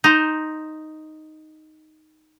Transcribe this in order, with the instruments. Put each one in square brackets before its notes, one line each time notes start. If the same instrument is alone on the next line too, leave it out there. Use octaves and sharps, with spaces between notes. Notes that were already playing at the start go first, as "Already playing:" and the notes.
[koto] D#4 C5